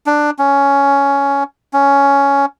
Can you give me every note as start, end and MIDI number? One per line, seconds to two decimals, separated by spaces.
0.06 0.31 62
0.39 1.44 61
1.73 2.46 61